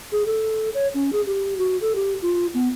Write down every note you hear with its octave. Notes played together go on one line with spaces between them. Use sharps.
G#4
A4
C#5
C#4
G#4
G4
F#4
A4
G4
F4
B3